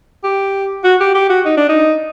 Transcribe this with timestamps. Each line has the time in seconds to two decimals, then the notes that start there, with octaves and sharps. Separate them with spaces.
0.24 G4
0.84 F#4
1.00 G4
1.15 G4
1.30 F#4
1.45 D#4
1.57 D4
1.69 D#4